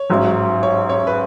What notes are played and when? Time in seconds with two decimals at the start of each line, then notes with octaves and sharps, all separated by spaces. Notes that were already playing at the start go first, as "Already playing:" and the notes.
Already playing: C#5
0.10 A1 G#2 F#3
0.63 C#5
0.89 C#5
1.07 B4